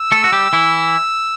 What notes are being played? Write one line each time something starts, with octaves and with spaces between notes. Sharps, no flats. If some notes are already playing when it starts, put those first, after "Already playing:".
Already playing: E6
A3 A4
F#4
G3 G4
E3 E4